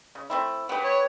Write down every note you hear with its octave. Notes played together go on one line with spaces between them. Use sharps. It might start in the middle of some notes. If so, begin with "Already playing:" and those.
C#3
A3 C4 E4
B3 G4 B4 G5 B5
C#5